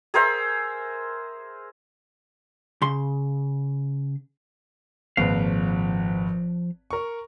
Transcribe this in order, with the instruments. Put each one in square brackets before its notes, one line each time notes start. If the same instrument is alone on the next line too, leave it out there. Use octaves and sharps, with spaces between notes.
[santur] G#4 A#4 C5 E5
[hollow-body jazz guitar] C#3 C6
[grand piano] G#1 A#2 B4 [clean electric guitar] F3 F5
[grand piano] A#4 C#6